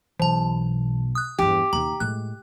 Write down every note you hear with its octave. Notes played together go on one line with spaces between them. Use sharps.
B1 B2 E3 A5
D#6 F#6
E2 G2 G4
D#2 C#3 A#5
A2 G#3 F#6